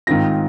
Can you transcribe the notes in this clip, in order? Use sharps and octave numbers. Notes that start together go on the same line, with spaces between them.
G#2 D#3 C4 F4 A#6